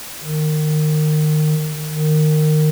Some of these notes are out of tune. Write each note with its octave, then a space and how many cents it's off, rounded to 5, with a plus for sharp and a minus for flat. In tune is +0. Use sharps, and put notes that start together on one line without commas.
D#3 -25
D#3 -20